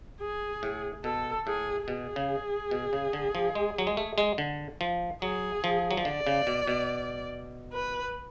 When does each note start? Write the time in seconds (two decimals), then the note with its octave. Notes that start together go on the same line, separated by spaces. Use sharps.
0.21 G#4
0.63 A2
1.04 B2 A4
1.47 A2 G#4
1.87 B2 G#4
2.16 C#3
2.71 B2
2.93 C#3
3.13 D3
3.35 F3
3.55 G#3
3.78 F#3
3.87 G#3
3.97 A3
4.18 G#3
4.38 D3
4.81 F3
5.22 F#3 G#4
5.64 F3
5.91 F#3
5.97 F3
6.05 D3 D5
6.27 C#3
6.47 B2
6.67 B2
7.73 B4